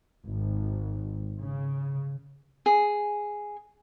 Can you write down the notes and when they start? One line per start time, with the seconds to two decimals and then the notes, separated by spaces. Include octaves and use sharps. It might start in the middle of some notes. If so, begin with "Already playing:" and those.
0.25 G#1
1.41 C#3
2.66 G#4